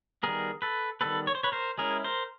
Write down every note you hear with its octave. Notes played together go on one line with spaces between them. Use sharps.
D#3 G3 B3 G#4 A#4
A4 B4
D#3 G3 B3 A4 B4
C#5
C5
B4 C#5
A#4 C5
G#3 C#4 E4 G#4 A#4
A#4 C5